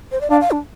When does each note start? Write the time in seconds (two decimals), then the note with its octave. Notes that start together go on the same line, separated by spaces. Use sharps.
0.12 C5
0.21 D5
0.30 D4 F5
0.41 F5
0.51 D4